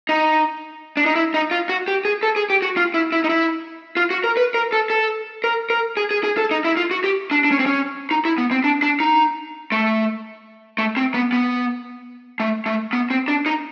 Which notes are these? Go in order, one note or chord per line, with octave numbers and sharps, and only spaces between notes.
D#4
D4
D#4
E4
D#4
F4
F#4
G4
G#4
A4
G#4
G4
F#4
F4
E4
E4
D#4
E4
F4
F#4
A#4
B4
A#4
A4
A4
A#4
A#4
G#4
G#4
G#4
A4
D#4
E4
F4
F#4
G4
D4
D4
C#4
C4
C#4
D#4
E4
B3
C4
D4
D4
D#4
A3
A3
C4
B3
B3
A3
A3
B3
C4
D4
D#4